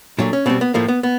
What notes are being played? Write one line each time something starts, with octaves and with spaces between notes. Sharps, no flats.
A#2 F#3 A3 D4
C#4
B2 G3 C4
B3
A2 F3 A3 A#3
B3
B3